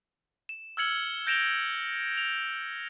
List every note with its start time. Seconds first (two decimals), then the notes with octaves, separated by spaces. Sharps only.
0.49 E7
0.77 E6 F6 G#6 C#7 F#7 G7
1.27 G6 A#6 D7 E7 F7 G7
2.17 F7